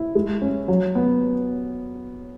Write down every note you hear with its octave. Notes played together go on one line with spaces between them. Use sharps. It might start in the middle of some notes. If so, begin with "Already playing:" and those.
Already playing: E4
G#3
C#4
F#3
B3